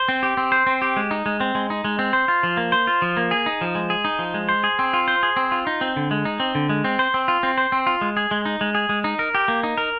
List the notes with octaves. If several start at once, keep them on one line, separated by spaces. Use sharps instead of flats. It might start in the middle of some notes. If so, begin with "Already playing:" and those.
Already playing: C5
C4
G4
C4
C5
C4
G4
G#3
D#4
G#3
C4
G#3
D#4
G#3
C4
C5
F4
F3
A#3
C5
F4
F3
A#3
G#4
D#4
F3
G#3
G#4
D#4
F3
G#3
C5
G#4
C4
F4
C5
G#4
C4
F4
D#4
C4
D3
G#3
D#4
C4
D3
G#3
C4
C5
C4
F4
C4
C5
C4
F4
G#3
G#4
G#3
D#4
G#3
G#4
G#3
D#4
A#4
G4
A#3
D#4
A#4